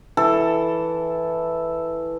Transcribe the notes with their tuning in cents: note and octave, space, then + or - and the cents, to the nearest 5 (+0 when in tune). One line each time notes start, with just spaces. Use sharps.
E3 +0 A4 +0